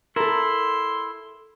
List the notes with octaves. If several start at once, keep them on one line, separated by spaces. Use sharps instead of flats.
E4 A4 A#4 C6